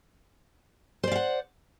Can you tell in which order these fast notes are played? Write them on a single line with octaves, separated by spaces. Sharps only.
C5 D5 F5 F#5